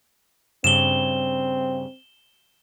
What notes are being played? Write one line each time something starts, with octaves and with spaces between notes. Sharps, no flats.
G2 C#3 C4 E7 G7